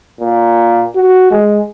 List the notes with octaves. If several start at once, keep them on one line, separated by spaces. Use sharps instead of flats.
A#2
F#4
G#3